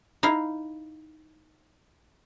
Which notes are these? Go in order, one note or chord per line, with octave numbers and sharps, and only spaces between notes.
D#4 E4 F5